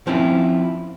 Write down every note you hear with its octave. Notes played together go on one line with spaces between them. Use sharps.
F3 C4 C#4 E4 F4